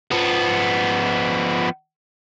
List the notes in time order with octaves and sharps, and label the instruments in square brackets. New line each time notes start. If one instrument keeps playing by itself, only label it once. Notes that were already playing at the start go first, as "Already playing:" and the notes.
[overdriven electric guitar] F3 B3